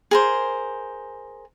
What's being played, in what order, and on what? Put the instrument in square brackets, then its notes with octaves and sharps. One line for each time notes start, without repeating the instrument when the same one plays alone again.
[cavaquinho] G#4 A#4 C5